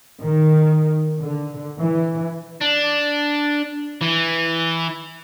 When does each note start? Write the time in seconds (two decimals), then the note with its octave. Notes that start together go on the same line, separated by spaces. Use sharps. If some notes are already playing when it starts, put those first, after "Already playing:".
0.23 D#3
1.21 D3
1.79 E3
2.61 D4
4.01 E3